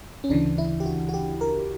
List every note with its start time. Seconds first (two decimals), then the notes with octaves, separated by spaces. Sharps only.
0.24 C#4
0.29 D2 C#3 E3 D4
0.58 E4
0.80 G4
0.86 F#4
1.09 F#4
1.14 G4
1.41 A#4